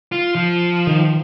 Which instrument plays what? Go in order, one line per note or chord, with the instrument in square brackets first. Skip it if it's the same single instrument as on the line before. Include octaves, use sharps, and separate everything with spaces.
[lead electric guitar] F4
F3
[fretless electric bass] D#3